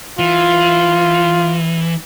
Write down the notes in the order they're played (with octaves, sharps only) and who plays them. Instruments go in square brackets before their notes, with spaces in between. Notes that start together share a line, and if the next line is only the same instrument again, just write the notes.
[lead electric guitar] E3 [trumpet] F4